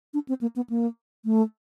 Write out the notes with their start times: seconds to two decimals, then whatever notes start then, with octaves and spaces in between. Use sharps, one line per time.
0.14 D4
0.28 C4
0.41 A#3
0.56 B3
0.69 A#3
1.25 A3